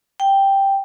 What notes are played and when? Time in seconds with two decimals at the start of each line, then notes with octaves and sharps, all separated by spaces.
0.20 G5